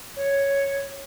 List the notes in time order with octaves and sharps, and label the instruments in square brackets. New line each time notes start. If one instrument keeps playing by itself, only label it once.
[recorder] C#5